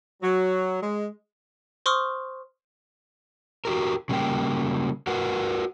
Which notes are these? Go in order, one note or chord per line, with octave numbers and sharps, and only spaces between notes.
F#3
G#3
C5 C6 C#6 D#6 F6
F#4 G4 A#4
C#3 G3 A#3 G5
F#4 A#4 B4 F#5